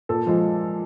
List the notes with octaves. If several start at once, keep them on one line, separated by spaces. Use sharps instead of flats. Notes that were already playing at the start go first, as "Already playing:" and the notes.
A#2 A4
F3 G#3